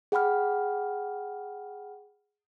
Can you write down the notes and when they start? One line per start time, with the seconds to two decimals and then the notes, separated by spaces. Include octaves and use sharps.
0.12 G#4 F#5 G5 B5 F6